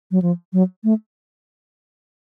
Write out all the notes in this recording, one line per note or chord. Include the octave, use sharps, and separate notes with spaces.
F#3
F3
F#3
A3